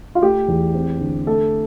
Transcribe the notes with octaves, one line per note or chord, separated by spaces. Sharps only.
F4
A3 G4
E2
C4
D3
A3 A4